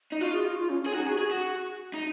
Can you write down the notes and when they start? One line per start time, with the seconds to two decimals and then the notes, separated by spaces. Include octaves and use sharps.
0.12 D#4
0.21 F4 F#4
0.33 G#4
0.45 F#4
0.58 F4
0.69 C#4
0.82 C#4
0.86 G#4
0.94 D#4 F#4
1.06 F#4 G#4
1.19 F#4 G#4
1.31 F#4
1.94 D#4